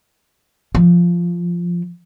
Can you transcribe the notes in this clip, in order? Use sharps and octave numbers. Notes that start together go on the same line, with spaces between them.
F3